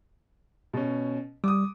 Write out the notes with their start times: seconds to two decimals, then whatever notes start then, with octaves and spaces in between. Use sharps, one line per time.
0.73 B2 C#4
1.44 G3 D6 D#6